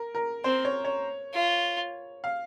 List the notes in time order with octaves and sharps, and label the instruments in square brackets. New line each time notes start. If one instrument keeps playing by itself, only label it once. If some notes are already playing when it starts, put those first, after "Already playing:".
Already playing: [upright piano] A#4
A#4
[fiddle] C4 [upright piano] C5
[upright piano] C#5
C#5
[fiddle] F4
[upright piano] F5